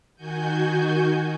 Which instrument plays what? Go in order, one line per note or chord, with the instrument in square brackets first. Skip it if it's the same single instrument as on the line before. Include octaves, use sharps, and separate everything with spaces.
[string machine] D#3 F#4 G#5 G6